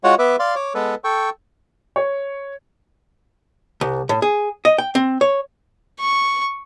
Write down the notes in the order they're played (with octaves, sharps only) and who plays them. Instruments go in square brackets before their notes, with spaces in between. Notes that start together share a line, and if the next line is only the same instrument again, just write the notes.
[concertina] G#3 F4 F#4 C#5 F#5
B3 B4 E5 D6
D5 F5 C6
C#5 D6
G#3 B3 A4 B4
A4 G5 C#6
[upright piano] C#5
[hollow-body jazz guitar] C2
A2
G#4
D#5
G5
C4
C#5
[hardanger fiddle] C#6